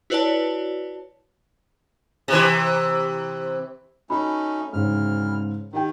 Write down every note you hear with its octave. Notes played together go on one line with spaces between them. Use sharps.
E4 F#4 B4 C#5 D5 A5
C3 E3
A3 C#4 D#4 F#4 B5
D2 G#2 C#3 F6
D#3 D#4 G4 G5